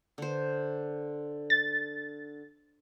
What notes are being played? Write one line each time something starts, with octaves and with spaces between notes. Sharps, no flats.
D3 C5
A6